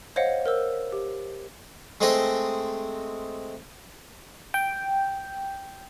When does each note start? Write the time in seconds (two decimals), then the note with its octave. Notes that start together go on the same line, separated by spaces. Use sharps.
0.16 C5 C#5 D#5 F5 F#5
0.46 A#4 C5 E6
0.92 G4
2.01 G#3 A3 C4 G#4 D#5
4.54 G5